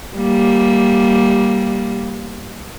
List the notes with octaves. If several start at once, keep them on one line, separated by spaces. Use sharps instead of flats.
G3 A#3